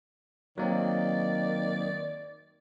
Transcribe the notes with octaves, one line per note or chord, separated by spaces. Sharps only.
D#3 F#3 A#3 C4 D5